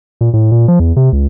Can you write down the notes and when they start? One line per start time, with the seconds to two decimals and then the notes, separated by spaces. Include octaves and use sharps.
0.21 A#2
0.33 A2
0.52 A#2
0.68 F3
0.80 E2
0.96 C3
1.12 C#2